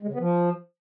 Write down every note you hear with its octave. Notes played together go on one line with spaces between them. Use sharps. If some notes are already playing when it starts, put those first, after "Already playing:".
G#3
C#3
B3
F3